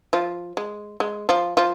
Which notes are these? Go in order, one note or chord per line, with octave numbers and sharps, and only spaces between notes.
F3 F4
G#3
G#3
F3 F4
F3 F4